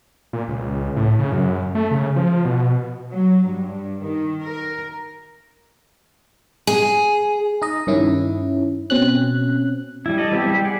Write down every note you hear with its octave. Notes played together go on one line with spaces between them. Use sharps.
A#2
C#2
A2
C#3
F#2
A3
C#3
F3
B2
F#3
G2
D#3
A#4
G#4
D#4 D#5
G2 D#3 C#4 E4
B2 C4 C#4 F#6
G3 E4
A4 D5 D#5
G3 B3 C4 E4 G4
G3 G4
G#4 D5 F#5